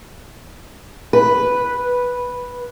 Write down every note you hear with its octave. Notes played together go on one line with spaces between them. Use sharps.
B4